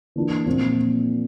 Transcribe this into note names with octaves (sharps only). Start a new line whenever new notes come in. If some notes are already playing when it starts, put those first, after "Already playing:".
E3 A#3 D4 F4
A#2 F3 C4 F4